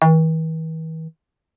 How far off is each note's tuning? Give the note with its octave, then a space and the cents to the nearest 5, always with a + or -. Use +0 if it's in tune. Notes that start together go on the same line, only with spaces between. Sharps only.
E3 -45